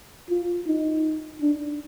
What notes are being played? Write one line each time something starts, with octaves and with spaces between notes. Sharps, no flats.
F4
D#4
D4